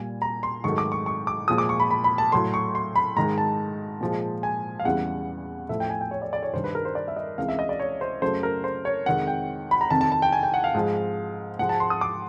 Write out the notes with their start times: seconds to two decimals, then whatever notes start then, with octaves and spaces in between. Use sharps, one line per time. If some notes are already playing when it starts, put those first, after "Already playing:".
Already playing: A#2 G3 G#5
0.22 A#5
0.43 C6
0.64 G#2 D#3 F#3 A3 C#6
0.78 D6
0.92 C#6
1.06 C#6
1.27 D6
1.48 A#2 F3 G#3 D#6
1.58 D6
1.69 C#6
1.80 B5
1.91 B5
2.04 B5
2.18 A5
2.32 A2 F#3 A3 C6
2.54 C#6
2.75 C6
2.96 B5
3.16 G#2 D#3 G#3 A#5
3.38 A5
4.00 A#2 F3 G#3
4.43 G#5
4.80 F5
4.85 E2 C#3 E3 G3 F#5
5.69 A2 F3 A3 E5
5.80 G5
5.90 G#5
6.01 G5
6.11 C#5
6.22 D5
6.33 D5
6.43 C#5
6.53 G2 D#3 G3 C5
6.64 B4
6.75 A#4
6.85 C5
6.95 D5
7.08 E5
7.16 D#5
7.38 C#2 C3 E3 G#3 F5
7.49 E5
7.59 D#5
7.69 D5
7.80 C#5
8.01 C5
8.22 F#2 C#3 F#3 A3 C5
8.43 A#4
8.64 C5
8.85 C#5
9.06 F2 C3 D#3 G#3 F#5
9.27 G5
9.71 B5
9.81 A#5
9.90 F2 C3 D#3 A5
10.01 A5
10.12 A5
10.22 G5
10.33 G#5
10.43 G5
10.54 F#5
10.64 F5
10.74 G#2 F3 G#3
11.59 G#2 F3 G#3 F#5
11.69 A5
11.80 C6
11.90 D#6
12.01 D6